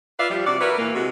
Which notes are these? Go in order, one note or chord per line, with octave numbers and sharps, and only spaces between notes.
F4 B4 D5 E5 F5
F3 G3
C3 F#4 D5
E4 F#4 A#4 B4
A#2 E3 A#3
C3 G#3 F#4